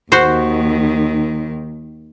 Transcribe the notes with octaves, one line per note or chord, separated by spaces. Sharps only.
D#2 D#3 F#4 C5